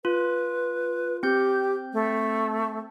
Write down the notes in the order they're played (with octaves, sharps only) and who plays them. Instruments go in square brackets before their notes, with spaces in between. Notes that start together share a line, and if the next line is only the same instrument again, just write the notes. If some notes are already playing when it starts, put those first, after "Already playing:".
[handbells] F4 [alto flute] B4
[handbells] C4 G6 [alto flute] G4
[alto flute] A3